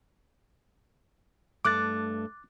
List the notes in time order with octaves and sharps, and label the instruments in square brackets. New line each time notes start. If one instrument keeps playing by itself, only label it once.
[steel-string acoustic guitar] G2 A3 [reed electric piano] D6 F#6 A6